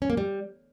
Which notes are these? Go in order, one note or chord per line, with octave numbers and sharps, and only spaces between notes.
C#4
A#3
G3